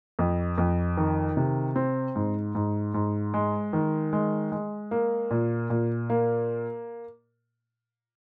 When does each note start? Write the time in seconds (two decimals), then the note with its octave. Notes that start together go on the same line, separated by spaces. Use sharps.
0.19 F2
0.58 F2
0.97 D#3
1.37 C3
1.76 C4
2.16 G#2
2.55 G#2
2.94 G#2
3.34 G#3
3.73 D#3
4.13 G#3
4.52 G#3
4.91 A#3
5.31 A#2
5.70 A#2
6.10 A#3